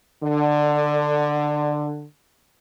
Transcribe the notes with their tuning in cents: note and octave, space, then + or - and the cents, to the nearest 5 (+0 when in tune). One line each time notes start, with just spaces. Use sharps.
D3 +15